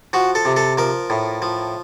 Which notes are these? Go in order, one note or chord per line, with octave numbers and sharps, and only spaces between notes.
F3 F#4
A4
C3
A4
F3 A#4
A2
F3